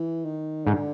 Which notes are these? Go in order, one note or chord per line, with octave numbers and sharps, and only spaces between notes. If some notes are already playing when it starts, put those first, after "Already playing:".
Already playing: E3
D#3
G#2 D3